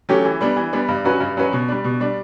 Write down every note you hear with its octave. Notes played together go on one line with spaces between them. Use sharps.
F#3 A3 C#4 G4
E3
G3 B3 D4
E3
G3 B3 D4
G2
F#3 C#4 F#4 B4
G2
F#3 C#4 F#4 B4
B2
G3 D4
B2
G3 D4